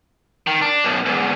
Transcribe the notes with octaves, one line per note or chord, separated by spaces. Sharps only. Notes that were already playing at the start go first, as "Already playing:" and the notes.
D#3
D4
B1 F#2
E2 G#2